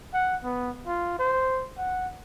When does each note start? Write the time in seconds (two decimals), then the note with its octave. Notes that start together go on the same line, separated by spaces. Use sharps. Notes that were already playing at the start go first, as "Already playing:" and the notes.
0.14 F#5
0.44 B3
0.87 F4
1.19 C5
1.78 F#5